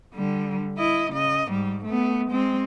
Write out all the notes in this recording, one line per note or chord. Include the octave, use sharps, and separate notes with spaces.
D3 G3
E4 D#5
C#3 D#5
G#2 G3
A3 B3
G#3 C4